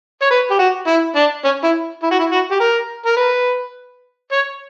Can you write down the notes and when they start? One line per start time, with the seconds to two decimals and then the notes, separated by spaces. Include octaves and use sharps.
0.22 C#5
0.30 B4
0.51 G4
0.59 F#4
0.87 E4
1.16 D4
1.44 C#4
1.64 E4
2.03 E4
2.11 F#4
2.20 E4
2.31 F#4
2.51 G4
2.60 A#4
3.06 A#4
3.17 B4
4.32 C#5